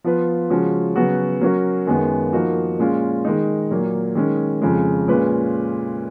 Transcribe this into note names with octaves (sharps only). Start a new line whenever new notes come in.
F3 B3 F4 B4
C#3 F3 G#3 C#4 F#4
C#3 F#3 B3 F#4
F#3 C#4 F#4 A#4
F#2 D#3 G#3 B3
F3 A#3 D#4 F#4
A#2 G#3 C#4 F4
D#3 G#3 D#4
A#2 F#3 A#3
D#3 G#3 C#4
F2 C#3 F3 G#3
A#2 G#3 C#4 F4 B4